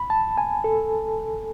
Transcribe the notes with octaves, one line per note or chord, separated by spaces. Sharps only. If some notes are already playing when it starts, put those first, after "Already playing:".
Already playing: B5
A5
G#5
A4